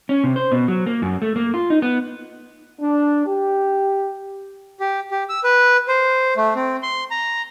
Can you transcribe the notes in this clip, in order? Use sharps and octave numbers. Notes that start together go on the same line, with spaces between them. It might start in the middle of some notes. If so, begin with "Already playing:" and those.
C#4
C3
C5
B2
F#3
A#3
F#2
A3
A#3
F4
D#4
B3
D4
G4
G4
G4
E6
B4
C5
A3
C4
C6
A#5